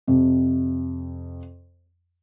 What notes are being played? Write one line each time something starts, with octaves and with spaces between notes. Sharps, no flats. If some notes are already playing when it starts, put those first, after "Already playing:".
F2 C3